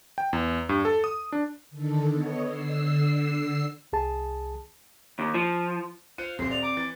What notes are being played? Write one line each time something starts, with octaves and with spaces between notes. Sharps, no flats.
G5
E2
G2
A4
D#6
D4
D3 D#3 A4
B3 C#5 D#5
D3 E6 C7
C2 G#4 A5
D#2
F3
F4 C5 F5 F#6 C#7 D#7
D#1 F#2 C4 C5 C7
D5 C7 F7
A#5 D6
E3 A6